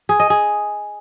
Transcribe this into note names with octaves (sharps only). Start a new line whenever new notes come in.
G#4
D#5
G#4